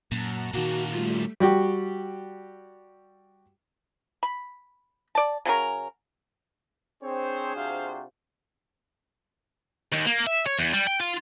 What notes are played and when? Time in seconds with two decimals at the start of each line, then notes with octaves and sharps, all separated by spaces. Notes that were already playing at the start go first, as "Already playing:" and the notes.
0.12 F#2 A#2 F#5 A5 A#5
0.54 A#2 D#3 F#3 A#3 F#4
0.92 G3 A3 F4 B6
1.40 G3 F#4 G4
4.23 B5
5.15 D5 A5
5.45 C#3 F#3 C#4 A#4
7.03 C4 D4 G#4 C5 C#5
7.56 C3 F4 F#4 F5
9.92 D#2
10.06 A#3
10.27 E5
10.46 C#5
10.59 E2
10.73 G3
10.87 G5
11.00 F4